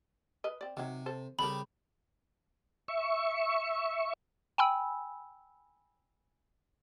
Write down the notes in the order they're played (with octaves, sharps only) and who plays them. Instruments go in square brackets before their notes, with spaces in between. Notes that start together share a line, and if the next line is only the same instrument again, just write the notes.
[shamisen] A#4 B4 D#5
C4 D5
[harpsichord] C3 [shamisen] D#3 F#3
[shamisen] A4 C5
[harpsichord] C#3 G3 G4 [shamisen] C4 A4 A#4 [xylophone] B5
[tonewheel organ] E5 C#6
[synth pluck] G5 G#5 B5 E6